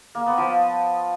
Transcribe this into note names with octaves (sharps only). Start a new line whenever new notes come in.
A#3
B3
F3